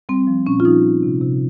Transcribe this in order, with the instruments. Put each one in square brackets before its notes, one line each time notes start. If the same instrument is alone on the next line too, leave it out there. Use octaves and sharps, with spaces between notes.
[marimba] G3 C4
F3
A#2 C#4
F4
F3 D#4
F3
C3
C3